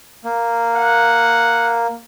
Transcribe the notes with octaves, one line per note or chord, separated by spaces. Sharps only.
A#3
F#5